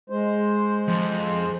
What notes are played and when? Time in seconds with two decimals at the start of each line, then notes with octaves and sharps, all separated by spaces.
0.10 G#3 C5
0.88 F2